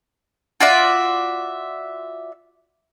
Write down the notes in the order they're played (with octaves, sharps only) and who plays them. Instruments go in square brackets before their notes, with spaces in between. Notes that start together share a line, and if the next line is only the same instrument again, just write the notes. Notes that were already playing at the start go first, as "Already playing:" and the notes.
[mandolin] F4 F#4 D5 E5